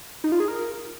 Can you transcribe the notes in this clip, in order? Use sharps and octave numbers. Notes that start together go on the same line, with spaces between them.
D#4
F4
G#4
A#4